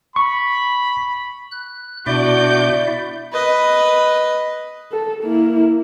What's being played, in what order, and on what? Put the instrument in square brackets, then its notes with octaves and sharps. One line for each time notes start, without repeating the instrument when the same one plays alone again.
[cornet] B5 [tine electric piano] C#6
[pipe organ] F#6
[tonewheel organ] B2 D4 D6 [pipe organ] E4 D5 E5 [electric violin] F#4 G6
[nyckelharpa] B4 D#5
[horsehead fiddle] A4
A#3 E4